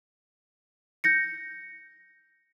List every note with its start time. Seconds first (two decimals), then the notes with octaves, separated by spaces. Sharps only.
1.04 G6 A#6 C#7